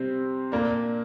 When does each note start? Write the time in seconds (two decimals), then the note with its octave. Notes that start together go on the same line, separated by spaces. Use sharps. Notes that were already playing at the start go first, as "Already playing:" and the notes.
Already playing: C3 G3 C4
0.52 A#2 A#3 D4